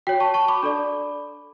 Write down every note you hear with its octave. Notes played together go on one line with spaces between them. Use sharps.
F#4 C#5 G5
A5 C#6
A5 C#6
B5 D6
D4 A4 D5